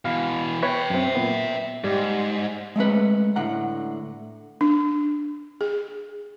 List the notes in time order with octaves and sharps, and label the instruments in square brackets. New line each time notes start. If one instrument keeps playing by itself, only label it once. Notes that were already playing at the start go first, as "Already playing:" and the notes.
[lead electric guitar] B2 E3 [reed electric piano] F5
[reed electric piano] B4 C#5 [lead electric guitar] E5 G5
[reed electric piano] F#2 C4
A#2 B3
[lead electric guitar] G#2 [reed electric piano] G3
[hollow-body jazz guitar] G#3 A3 C#4 B4
A2 D3 F#5 A#5
[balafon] D4
G#4